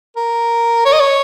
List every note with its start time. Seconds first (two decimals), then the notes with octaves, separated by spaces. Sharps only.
0.16 A#4
0.85 C#5
0.93 D#5
1.00 C#5